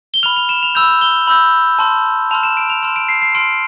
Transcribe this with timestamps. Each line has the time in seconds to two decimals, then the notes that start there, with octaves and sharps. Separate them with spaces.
0.14 G7
0.23 B5 F6 F7
0.36 F7
0.49 E7
0.63 F7
0.75 B5 E6 G6 F7
1.01 G7
1.27 B5 E6 G6
1.79 A5 C6 F6
2.31 A5 C6 F6 F7
2.43 E7
2.57 D7
2.70 F7
2.83 C6 F6 E7
2.96 D7
3.09 C7
3.22 C7
3.35 C6 F6 D7